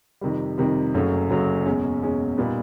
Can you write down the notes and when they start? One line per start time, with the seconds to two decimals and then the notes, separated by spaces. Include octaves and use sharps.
0.21 F2 C3 D#3 G3
0.58 F2 C3 D#3 G3
0.94 F#1 F#2 C#3 F#3 A3
1.30 F#1 F#2 C#3 F#3 A3
1.66 E2 B2 G#3 C#4
2.01 E2 B2 G#3 C#4
2.38 A#2 G3 B3 D#4